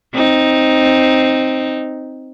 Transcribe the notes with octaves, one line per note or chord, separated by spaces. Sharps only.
C4 D#4